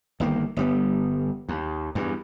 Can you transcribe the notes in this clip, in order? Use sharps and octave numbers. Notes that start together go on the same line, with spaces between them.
G1 D#3 A#3
G1 G3 B3
D#2
E2 G2